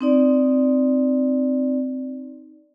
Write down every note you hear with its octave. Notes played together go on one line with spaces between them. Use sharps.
C4 D#4 D5